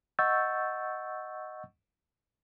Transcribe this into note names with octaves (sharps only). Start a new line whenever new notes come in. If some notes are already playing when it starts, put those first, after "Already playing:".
D#5 F#5 C#6 E6 G6 A6